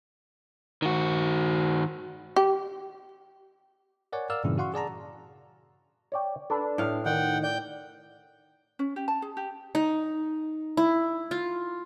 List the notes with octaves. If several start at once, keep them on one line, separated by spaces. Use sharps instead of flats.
D#3 F#4
G4
A#4 C#5 D5 F#5 G#5
A#4 D5 F5 E6 F6
G2 A#2 C#3 E3 E4
F#4 F5 F#5 C6 C#6
G#4 D5 A5 A#5
C#5 D5 G5
D4 A4 B4
A2 F5
D#3 F#5 G5
D5 G5 G6
C#4
G4
A5
G#4
G4
D#4
E4
F4